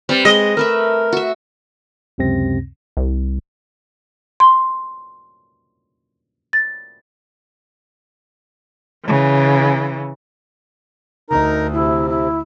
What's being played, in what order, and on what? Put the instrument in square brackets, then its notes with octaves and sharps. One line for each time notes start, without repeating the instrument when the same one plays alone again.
[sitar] G3 [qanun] C4 B4
[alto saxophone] G#3 [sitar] D#5
[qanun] A3 B4 E5 [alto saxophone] A#4
[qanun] F#4 E5
[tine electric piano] C#2 F#2 C3 C4 A#6
[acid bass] C2
[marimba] C6
A6
[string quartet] C#3 E3
[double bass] D2 [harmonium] D#4 A#4 A#5
[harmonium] C3 [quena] E4
[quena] E4